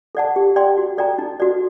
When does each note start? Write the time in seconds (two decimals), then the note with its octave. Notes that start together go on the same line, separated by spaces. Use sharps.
0.15 A4 D5 F#5 A5
0.36 G4
0.56 D5 G5 C6
0.78 F#4
0.98 A4 D5 G5 A#5
1.18 D#4
1.40 F#4 A4 D5